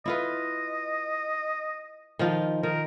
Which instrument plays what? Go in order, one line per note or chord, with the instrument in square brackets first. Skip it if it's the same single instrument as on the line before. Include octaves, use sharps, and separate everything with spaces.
[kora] E4 F4 B4 [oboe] D#5
[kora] D#3 F3 F4
[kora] D#3 [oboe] A#4